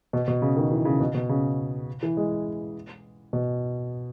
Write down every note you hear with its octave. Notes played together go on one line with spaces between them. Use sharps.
B2
B2
C#3
D#3
E3
C#3
B2
B2
C#3
E3
G#3
B2